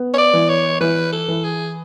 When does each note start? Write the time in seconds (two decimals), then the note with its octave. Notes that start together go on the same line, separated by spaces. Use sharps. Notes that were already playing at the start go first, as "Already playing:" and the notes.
Already playing: B3
0.14 C#5
0.18 D5
0.33 E3
0.49 C#5
0.81 E3 B4
1.12 A4
1.28 E3
1.44 G#4